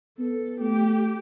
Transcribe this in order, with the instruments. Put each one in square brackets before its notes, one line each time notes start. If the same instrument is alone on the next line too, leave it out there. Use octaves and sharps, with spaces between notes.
[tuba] B3 [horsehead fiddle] A4
[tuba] A3 [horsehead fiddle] G4